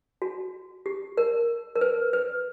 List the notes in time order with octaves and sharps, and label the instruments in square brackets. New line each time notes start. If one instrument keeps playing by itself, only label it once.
[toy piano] F#4
G4
A#4
A#4
B4
B4